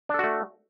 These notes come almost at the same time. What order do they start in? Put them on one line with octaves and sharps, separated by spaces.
D4 A4 F#4 A3